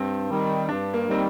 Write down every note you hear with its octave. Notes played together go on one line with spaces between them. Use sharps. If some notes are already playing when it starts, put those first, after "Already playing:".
Already playing: G2 C4
D#3 G3
G2 D4
A#3
D#3 G3 C4